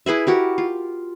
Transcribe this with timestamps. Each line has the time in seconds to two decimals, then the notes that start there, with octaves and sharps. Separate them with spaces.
0.06 E4 G#4 B4 E5
0.27 F#4 G4 A#4
0.58 F4